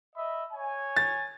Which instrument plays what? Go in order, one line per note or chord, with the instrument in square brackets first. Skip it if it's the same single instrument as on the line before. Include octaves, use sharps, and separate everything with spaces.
[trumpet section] D#5 E5 B5
C#5 G#5
[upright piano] A6